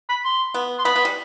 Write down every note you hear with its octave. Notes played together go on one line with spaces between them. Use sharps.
B5
C6
B3
C6
B3 B5
B3
G3